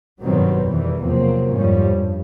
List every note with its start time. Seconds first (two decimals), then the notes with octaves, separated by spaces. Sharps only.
0.21 G2 B2 D#3 F#3 G3 C4
0.65 E2 D#3 E3 G3
1.01 C3 F3 F#3 A#3 C4
1.51 F2 G#2 F3 G3 C#4
1.90 G2